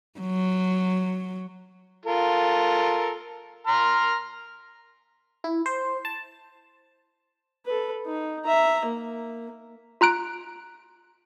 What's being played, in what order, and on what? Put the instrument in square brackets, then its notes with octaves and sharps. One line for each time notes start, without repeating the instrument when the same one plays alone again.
[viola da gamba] F#3
[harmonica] F4 A4 A#4
A#5 C6 F6
[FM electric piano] E4
C5
A5
[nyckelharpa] A4 B4
D#4
E5 A#5
A#3
[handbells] F4 A#5 F#6 D7